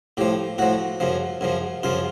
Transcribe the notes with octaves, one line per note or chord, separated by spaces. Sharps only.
A2 F3 G4
A2 F3 F#4
F#2 C#3 F3
F#2 C#3 F3
F#2 C#3 F3 F4